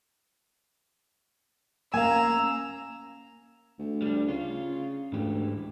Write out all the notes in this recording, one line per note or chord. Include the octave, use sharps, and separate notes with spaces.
A#3 C#4 F5 G#5 A#5 E6
D2
G3 D4
C#3 F4
D2 G#2 E3 G4